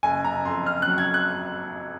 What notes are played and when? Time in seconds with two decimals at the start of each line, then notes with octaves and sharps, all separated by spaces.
0.03 F#1 G#5
0.24 F#1 A#5
0.45 F2 C6
0.66 F#1 F6
0.82 F#6
0.88 F#3
0.98 G#6
1.14 F#6